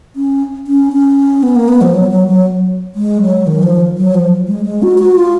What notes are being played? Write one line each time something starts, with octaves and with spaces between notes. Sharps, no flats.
C#4
C#4
C#4
B3
A#3
B3
F3
F#3
F#3
F#3
G#3
F#3
D#3
F3
F#3
F3
G#3
G#3
F#4
F#4
F4